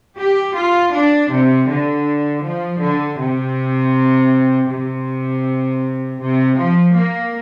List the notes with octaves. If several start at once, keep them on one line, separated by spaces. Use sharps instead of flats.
G4
F4
D4
C3
D3
F3
D3
C3
C3
C3
F3
A#3